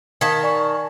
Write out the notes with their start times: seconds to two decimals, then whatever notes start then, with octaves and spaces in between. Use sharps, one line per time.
0.21 D#3 F5 A5 G#6 B6
0.43 D5 G#5 C#6